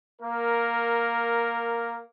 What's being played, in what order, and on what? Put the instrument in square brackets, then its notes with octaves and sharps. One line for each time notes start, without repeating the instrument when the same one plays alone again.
[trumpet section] A#3 A#4